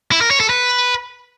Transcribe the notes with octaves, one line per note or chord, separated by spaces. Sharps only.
E4
A#4
C#5
A4
B4